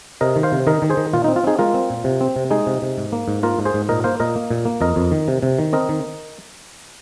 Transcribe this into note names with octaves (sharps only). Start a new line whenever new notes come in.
C3 A#4 D#5
D#3
C5 F5
C3
D#3 A#4 D#5
D#3
G#4 C5
D#3
A#2 F4
D#4
C4
F4
C4 D#4 G#4
G#3 F4 A#4
C4
A#2
C3
C4
C3
G#3 D#4 G#4
C3
C3
G#2
A#3
G#2
A#3 F4 A#4
G#2
G#4 C5
G#2
A#2 A#4 D#5
A#3 C5 F5
A#2 A#4 D#5
A#3
A#2
A#3
F2 A#4 D#5
F2
D#3
C3
C3
D#3
C4 A#4 D#5
D#3